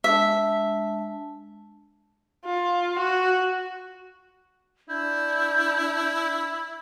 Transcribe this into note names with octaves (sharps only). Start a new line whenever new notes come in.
G#3 D4 E5 A5
F4
F#4
D4 E4 G6